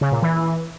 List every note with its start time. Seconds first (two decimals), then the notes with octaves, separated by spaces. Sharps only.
0.01 C#3
0.12 A#2
0.22 E3